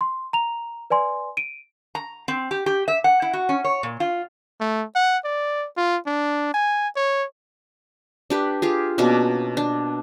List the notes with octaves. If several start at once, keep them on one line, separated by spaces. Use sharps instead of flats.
C6
A#5 F7
B4 D5 G#5 C6
D7 D#7
A#5
C4
G4
G4
E5
F#5
E4
F#4
C#4
C#5
A#2
F4
A3
F#5
D5
F4
D4
G#5
C#5
D4 G4 B4
F4 G4 G#4
B2 A#3 C#4 D4
D4